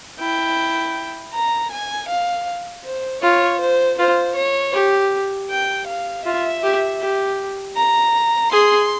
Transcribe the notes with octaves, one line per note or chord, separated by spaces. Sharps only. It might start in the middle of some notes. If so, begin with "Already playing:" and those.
E4 G5
A#5
G#5
F5
C5
F4 C#5
C5
F4 C5
C#5
G4
G5
F5
F4 E5
G4
G4
A#5
G#4 C6